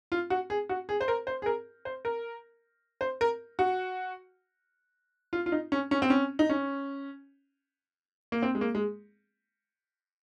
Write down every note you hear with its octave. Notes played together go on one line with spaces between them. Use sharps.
F4
F#4
G#4
F#4
G#4
C5
A#4
C5
G#4
A#4
C5
A#4
C5
A#4
F#4
F4
F4
D#4
C#4
C#4
C4
C#4
D#4
C#4
A#3
C4
G#3
A#3
G#3